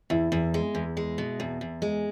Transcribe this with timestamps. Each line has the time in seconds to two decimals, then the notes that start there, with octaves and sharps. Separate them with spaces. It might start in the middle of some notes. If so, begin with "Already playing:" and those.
0.10 E2 E4
0.32 E2
0.54 G#3
0.75 E2
0.97 G#3
1.18 B2
1.40 E2
1.61 E2
1.82 G#3